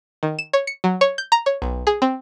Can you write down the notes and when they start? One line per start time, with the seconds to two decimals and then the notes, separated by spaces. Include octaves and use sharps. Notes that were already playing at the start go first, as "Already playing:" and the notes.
0.23 D#3
0.39 E7
0.53 C#5
0.67 C#7
0.84 F#3
1.01 C#5
1.18 G6
1.32 A#5
1.46 C#5
1.62 B1
1.87 G#4
2.02 C4